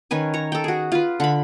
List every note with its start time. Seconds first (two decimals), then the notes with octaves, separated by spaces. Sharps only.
0.11 D#3 C#4 B4 G#5
0.34 C#5 A#5
0.52 A4 G5
0.64 F#4 G#4
0.92 F4 B4
1.20 D3 B5